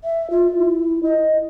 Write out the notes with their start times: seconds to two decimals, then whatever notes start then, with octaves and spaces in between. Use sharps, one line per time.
0.04 E5
0.30 F4
0.58 E4
1.03 D#5